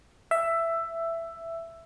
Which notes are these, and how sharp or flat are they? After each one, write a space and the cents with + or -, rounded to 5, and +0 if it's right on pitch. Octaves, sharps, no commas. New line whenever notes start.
E5 +10